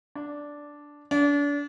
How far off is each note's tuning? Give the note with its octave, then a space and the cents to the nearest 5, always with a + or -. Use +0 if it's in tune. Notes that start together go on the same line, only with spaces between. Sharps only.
D4 -5
D4 -35